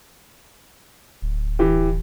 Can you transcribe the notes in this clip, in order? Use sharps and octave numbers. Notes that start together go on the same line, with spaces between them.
D1
E3 G4